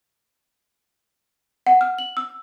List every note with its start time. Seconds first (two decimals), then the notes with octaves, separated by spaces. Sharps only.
1.67 F#5
1.81 F6
1.98 F#7
2.17 E6